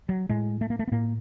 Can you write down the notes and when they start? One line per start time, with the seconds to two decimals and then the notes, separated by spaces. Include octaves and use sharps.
0.09 F#3
0.29 A2 G#3
0.61 A3
0.70 A#3
0.79 A3
0.88 B3
0.92 A2 A#3